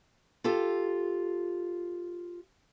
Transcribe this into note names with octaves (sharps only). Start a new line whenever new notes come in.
F4 G4 A4